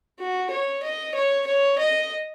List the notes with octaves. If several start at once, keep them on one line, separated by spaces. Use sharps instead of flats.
F#4
C#5
D#5
C#5
C#5
D#5